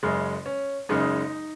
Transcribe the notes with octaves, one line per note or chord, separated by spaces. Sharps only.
F#1 F#2 C#3 G#3
C#4
F#1 F#2 C#3 G#3 D#4